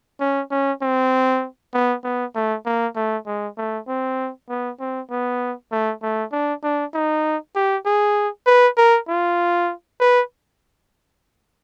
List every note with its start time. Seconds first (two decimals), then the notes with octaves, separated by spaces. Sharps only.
0.20 C#4
0.51 C#4
0.82 C4
1.74 B3
2.04 B3
2.35 A3
2.66 A#3
2.96 A3
3.26 G#3
3.57 A3
3.88 C4
4.49 B3
4.80 C4
5.11 B3
5.72 A3
6.03 A3
6.32 D4
6.63 D4
6.94 D#4
7.56 G4
7.86 G#4
8.47 B4
8.77 A#4
9.08 F4
10.00 B4